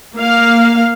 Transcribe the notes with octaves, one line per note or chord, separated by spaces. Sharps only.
A#3 F5